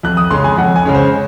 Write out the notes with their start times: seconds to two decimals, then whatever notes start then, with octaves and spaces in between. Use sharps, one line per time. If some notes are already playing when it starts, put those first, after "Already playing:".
0.03 F2 F#6
0.17 D#6
0.31 C#3 G#3 C#4 C6
0.44 G#5
0.58 F2 F#5
0.76 G#5
0.85 C#3 G#3 C#4
0.94 C5